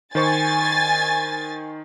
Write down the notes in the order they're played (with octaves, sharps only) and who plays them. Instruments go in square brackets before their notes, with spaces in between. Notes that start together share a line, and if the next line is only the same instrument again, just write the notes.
[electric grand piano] D#3 C5 C#6 [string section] G#5 A6